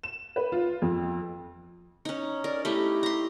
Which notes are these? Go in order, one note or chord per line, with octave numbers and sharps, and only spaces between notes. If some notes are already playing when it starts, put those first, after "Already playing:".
E7
B4
F4
F2
C#4 D#4
A#4 D5
A3 D#4 E4 G4
A#5 C6